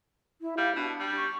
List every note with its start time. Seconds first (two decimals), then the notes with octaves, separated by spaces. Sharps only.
0.41 E4
0.58 G3 F5
0.76 B2 D4
1.00 G3
1.15 C#6